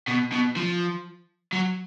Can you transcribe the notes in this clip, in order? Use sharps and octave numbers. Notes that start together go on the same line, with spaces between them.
B2
B2
F3
F#3